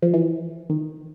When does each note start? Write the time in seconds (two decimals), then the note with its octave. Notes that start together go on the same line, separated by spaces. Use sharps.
0.02 F3
0.14 E3
0.70 D#3